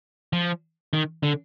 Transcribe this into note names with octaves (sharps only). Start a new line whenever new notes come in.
F3
D#3
D3